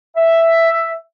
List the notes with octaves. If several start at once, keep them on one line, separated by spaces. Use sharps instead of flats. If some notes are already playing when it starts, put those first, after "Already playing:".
E5